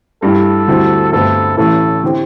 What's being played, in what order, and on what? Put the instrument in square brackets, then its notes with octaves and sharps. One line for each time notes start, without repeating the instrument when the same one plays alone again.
[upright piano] G2 G3 E4 [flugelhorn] A4
[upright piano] D2 D3 G3 C4 E4
[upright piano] G1 G2 D3 A3 C4 [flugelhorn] A4
[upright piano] A1 A2 E3 [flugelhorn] A4
[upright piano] D3 C4 E4 G4